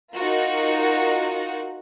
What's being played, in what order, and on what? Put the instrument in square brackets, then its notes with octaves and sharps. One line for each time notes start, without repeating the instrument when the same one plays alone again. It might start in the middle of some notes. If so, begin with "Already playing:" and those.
[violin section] D#4 F4 F#4 A#4